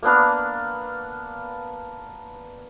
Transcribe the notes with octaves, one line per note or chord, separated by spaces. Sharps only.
A#3 B3 D4 F5